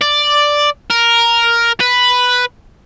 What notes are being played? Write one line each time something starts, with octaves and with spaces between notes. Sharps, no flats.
D5
A#4
B4